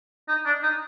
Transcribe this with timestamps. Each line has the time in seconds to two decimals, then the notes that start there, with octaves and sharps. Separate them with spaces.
0.28 D#4
0.45 D4
0.63 D#4